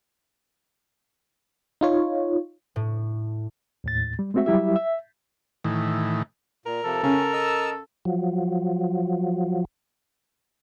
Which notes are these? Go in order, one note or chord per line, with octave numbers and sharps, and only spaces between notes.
D#4 F4 C#5
A2
D#2 A2 A6
G3
G#3 A3 C4 F#4 E5
F#3 G3 E4 G4 E5
E5
A2 D#3 E3
A#2 A#4
C3 F3 A4
C#3 C#4 A#4
D#5 A5 E6
F3 F#3